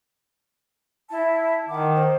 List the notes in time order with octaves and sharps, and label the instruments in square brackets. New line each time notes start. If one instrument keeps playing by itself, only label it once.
[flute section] E4 A5
[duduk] D#3 [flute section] F#5 D6
[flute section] C5